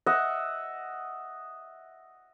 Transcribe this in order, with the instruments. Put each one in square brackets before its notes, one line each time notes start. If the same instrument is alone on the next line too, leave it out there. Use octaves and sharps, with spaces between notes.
[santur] D#5 E5 F#5